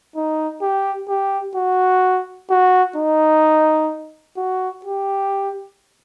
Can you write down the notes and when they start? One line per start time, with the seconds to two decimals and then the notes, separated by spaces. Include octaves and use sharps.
0.16 D#4
0.62 G4
1.08 G4
1.55 F#4
2.50 F#4
2.96 D#4
4.37 F#4
4.85 G4